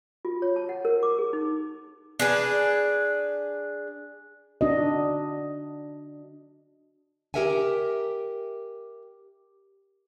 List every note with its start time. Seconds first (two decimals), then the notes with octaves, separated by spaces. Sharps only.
0.25 F4
0.42 C#5
0.56 A5
0.69 F#5
0.85 A#4
1.03 D6
1.19 G#4
1.33 D#4
2.20 D4 G#4 B4
4.61 D4 F#4 D#5
7.34 G4 A4 A#4 E5 F#5 G#5